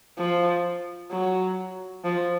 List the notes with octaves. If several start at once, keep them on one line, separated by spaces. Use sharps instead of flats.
F3
F#3
F3